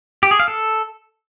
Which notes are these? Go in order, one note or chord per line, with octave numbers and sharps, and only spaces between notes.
G4
G#4
F5
A4